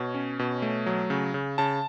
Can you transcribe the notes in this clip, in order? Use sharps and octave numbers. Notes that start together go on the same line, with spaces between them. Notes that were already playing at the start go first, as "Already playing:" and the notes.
Already playing: B2 C#5
C#4
B2
A3
F#3
C#3
C#3
C#3 A5